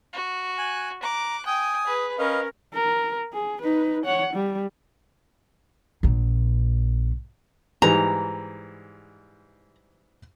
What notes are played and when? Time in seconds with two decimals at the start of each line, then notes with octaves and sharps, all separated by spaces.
0.14 F#4
0.58 G#5 F#6
1.03 A#5 D6 F#6
1.46 G5 G#5 D#6
1.85 G#4 B4
2.18 C#4 A#4 B4 D#5 F5
2.74 A#4
3.33 G#4
3.61 D#4 B4
4.04 C#5 F#5
4.33 G3
6.03 A#1 A#2
7.82 G#2 E3 G3 A#5